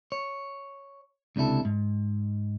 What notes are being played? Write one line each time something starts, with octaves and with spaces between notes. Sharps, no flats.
C#5
C#2 C3 D4 E4 A4
G#2